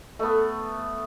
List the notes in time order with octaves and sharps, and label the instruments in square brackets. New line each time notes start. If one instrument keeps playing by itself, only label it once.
[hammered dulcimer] A3 B3